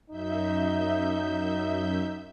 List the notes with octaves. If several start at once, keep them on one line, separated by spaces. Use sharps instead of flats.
F#2 D#4 E5 G6